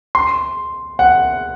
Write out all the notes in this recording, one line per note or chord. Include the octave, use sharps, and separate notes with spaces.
C6
F#5